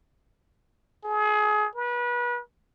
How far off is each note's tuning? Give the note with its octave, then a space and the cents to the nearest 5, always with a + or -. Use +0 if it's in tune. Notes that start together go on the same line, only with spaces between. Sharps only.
G#4 +30
B4 -30